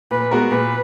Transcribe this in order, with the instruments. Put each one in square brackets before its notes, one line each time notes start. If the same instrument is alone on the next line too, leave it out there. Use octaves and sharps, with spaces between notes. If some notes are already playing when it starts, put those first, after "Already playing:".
[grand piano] A#2 [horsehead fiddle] B4
[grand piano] G#3 B3 F#4 A#4
[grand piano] A#2 [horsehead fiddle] B4